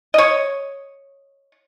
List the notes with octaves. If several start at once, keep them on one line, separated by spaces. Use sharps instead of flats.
C#5 D#5